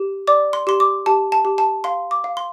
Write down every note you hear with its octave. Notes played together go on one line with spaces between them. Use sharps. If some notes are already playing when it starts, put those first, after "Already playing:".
Already playing: G4
D5 D6
C6
G4 C6
D6
G4 A5
A5
G4
A5
F5 C6
D6
F5
C6